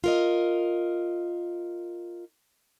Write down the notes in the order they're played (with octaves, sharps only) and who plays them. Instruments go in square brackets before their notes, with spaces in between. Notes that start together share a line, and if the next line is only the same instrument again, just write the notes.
[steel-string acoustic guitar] F4 A#4 D#5